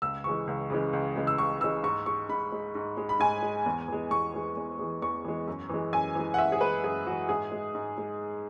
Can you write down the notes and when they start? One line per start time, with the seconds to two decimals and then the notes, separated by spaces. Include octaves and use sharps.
0.02 C#2 E6
0.24 C#3 E3 G#3 C#6
0.47 C#2
0.70 C#3 E3 G#3
0.93 C#2
1.16 C#3 E3 G#3
1.27 E6
1.38 C#2 C#6
1.61 C#3 E3 G#3 E6
1.83 G#2 C#6
2.06 G#3 C#6
2.29 G#2 B5
2.52 G#3
2.75 G#2
2.97 G#3
3.09 B5
3.19 G#2 G#5
3.43 G#3
3.66 E2
3.88 E3 G#3
4.11 E2 C#6
4.33 E3 G#3
4.57 E2
4.79 E3 G#3
5.02 E2 C#6
5.25 E3 G#3
5.47 F#2
5.70 E3 G#3
5.93 F#2 G#5
6.15 E3 G#3
6.34 F#5
6.38 F#2 E5
6.52 G#4
6.61 G#3 B4
6.66 E3
6.84 F#2 G#4
7.06 E3 G#3 F#4
7.29 G#2 G#4
7.52 G#3
7.75 G#2
7.98 G#3